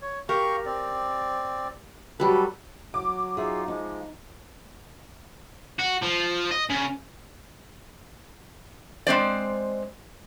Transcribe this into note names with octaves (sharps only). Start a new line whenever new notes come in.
C#5
G4 A#4 F5 G5 C#6
C4 D5
F#3 G3 A4 B4
F#3 D6
D#4 F4 G#4 E5
F3 G#3 D#4
F#4
F3
D#5
C#3
G#3 C4 C5 D5